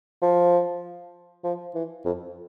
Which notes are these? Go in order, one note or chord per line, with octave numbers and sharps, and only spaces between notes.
F3
F3
E3
F2